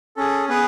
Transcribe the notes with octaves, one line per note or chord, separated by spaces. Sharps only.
C#4 G#4 A4
B3 G#4 B4